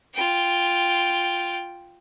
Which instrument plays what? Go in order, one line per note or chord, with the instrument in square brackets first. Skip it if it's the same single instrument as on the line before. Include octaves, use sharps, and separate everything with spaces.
[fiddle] F4 G5